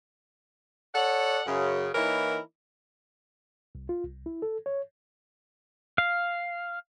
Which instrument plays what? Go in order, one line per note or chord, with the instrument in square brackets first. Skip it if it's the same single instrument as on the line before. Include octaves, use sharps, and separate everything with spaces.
[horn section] A4 C#5 D5 F#5
F#2 C#3
E3 A#3 D#4 E4 A#4 C#5
[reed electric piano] C2
F4
C2
E4
A4
C#5
[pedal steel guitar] F5